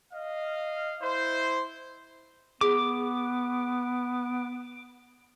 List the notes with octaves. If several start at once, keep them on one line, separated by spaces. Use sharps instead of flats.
D#5 F5
E4 C5
B3 G#4 D6